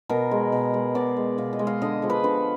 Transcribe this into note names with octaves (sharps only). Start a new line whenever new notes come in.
B2 A#4
G#3
B2
G#3
B2 D5
G#3
B2 F5
D#5
G#3
F5
D3 D#5
F3 G#3
B4
D3 B4